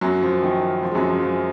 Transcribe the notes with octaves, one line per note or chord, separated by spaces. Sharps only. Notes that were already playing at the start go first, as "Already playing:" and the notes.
F#2 F#3
F3
D#3
F3
G#3
F#2 F#3
F3
F3